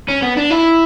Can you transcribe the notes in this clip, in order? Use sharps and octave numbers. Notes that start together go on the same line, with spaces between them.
C#4
B3
D4
E4